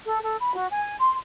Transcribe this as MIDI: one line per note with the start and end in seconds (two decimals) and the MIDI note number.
0.05 0.19 69
0.23 0.36 69
0.39 0.53 83
0.54 0.67 66
0.70 0.95 80
1.00 1.14 84